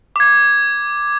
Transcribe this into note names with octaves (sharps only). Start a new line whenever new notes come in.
D6 G#6